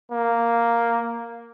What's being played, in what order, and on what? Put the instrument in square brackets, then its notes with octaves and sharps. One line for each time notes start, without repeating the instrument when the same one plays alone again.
[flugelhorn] A#3